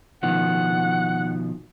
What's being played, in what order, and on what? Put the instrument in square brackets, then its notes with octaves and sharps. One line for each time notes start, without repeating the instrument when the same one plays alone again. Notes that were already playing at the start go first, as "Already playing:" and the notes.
[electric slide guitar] B2 D#3 F3 [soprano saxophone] F#5